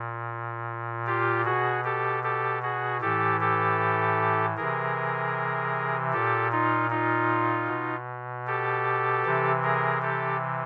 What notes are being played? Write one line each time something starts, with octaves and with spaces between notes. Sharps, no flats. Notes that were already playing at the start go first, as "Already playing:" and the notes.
Already playing: A#2
F4 G4
B2 F#4 G#4
G4 A4
G4 A4
F#4 G#4
A2 E3 G4 A4
G4 A4
C3 E3 G#4 A#4
A#2 G4 A4
D#4 F4
D#4 F4
B2
G4 A4
C3 E3
G#4 A#4
G4 A4